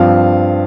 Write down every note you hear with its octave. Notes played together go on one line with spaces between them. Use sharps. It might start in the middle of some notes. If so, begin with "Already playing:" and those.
Already playing: G2 F3 C4 F5